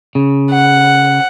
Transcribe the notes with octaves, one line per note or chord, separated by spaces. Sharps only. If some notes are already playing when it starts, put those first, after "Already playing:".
C#3
F#5